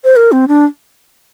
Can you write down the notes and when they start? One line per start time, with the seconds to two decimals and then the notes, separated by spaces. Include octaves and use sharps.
0.04 C5
0.16 A#4
0.32 C4
0.48 D4